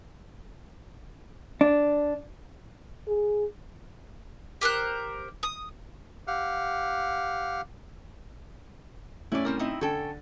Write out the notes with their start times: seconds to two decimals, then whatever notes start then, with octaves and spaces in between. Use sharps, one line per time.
1.61 D4
3.08 G#4
4.61 G4 A#4 C5 F#6
5.43 D#6
6.27 G4 F5 F#5
9.32 A2 C#4 E4 D5
9.45 G3 C4 A#4
9.59 C4 D#4 E4
9.81 D3 C#4 A4 G5